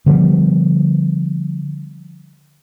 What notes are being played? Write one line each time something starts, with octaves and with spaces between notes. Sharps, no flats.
D3 F3 G3 B3